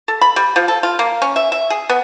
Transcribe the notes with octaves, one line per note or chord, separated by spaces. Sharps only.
A4
B5
G3
F3
A4
F4
A#3
C#4
E5
E5
G#4
B3